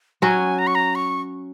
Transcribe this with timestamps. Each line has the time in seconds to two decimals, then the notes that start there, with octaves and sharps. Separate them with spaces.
0.22 F#3 C#4 F#4 G#5
0.59 A#5
0.67 C#6
0.75 A#5
0.95 C#6